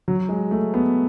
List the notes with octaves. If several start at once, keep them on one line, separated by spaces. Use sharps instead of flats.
F#3
G#3
A3
B3